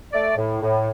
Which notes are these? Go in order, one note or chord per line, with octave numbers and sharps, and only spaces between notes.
A3 D5
A2
A2